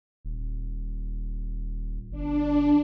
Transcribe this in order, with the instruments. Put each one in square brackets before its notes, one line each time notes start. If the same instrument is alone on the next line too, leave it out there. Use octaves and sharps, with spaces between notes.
[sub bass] D#1
[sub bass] G1 [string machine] D4